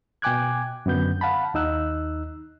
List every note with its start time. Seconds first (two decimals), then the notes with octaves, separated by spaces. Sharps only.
0.22 B2 G5 G#5 D6 F#6 G#6
0.86 F#2 D3 B3 G6
1.21 F5 F#5 A5 B5
1.54 D#2 D#4 E6 F#6